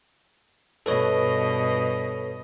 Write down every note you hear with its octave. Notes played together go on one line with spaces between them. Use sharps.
G2 B2 A4 B4 C#5 D#5